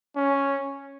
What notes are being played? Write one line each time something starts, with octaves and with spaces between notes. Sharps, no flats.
C#4